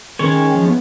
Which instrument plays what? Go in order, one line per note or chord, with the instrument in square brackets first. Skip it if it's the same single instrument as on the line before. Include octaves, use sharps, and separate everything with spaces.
[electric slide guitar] D#3 A#4 [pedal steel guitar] G#3 C#4 C#5
[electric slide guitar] F3
B3